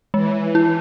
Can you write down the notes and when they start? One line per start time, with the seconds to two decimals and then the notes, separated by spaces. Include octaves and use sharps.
0.14 E3 G#3
0.55 E4